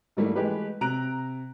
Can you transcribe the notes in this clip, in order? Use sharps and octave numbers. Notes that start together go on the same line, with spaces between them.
G#2 D#3 G3 A3 A#3 E4
E3 G#3 A3 G4 B4
C3 A#5 F#6 D7